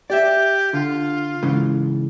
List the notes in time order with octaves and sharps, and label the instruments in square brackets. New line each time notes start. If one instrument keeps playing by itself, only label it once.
[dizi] G4 [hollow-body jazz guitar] D5 E5
[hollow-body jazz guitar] D3 [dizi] F4
[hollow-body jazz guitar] G#2 C#3 E3